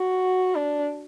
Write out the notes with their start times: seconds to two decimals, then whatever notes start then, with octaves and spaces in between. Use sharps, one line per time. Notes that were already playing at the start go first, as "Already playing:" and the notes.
Already playing: F#4
0.55 D4